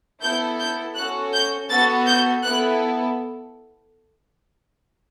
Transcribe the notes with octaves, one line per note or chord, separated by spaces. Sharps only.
B3 E4 A4 G6
G6
C#4 F#4 A4 F#6
G6
B3 F#4 A4 A6
G6
B3 E4 A4 F#6